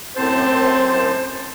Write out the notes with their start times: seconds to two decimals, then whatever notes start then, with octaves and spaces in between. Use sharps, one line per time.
0.16 F#2 A2 C4 C5 A5